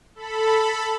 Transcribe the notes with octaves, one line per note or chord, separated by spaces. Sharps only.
A4 B5